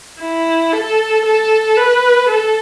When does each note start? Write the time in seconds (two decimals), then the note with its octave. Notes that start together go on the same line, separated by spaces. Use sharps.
0.20 E4
0.72 A4
1.25 A4
1.77 B4
2.29 A4